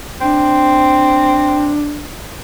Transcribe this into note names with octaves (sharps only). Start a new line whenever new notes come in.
C4 D4